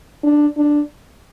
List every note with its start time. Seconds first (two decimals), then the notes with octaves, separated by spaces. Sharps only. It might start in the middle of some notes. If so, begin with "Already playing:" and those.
0.24 D4
0.57 D4